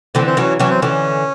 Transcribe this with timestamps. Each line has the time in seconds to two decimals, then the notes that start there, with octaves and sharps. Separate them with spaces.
0.15 D3 E3 C4
0.27 C4
0.37 E3 F#3 C#4
0.59 E3 F#3 C#4
0.70 C4
0.81 D3 E3 C#4